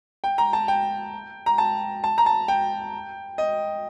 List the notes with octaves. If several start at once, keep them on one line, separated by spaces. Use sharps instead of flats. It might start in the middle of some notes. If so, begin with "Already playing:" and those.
G5
A#5
A5
G5
A#5
A5
A5
A#5
A5
G5
D#5